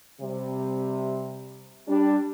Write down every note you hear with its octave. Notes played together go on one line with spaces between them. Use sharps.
C3 G3
G3 D4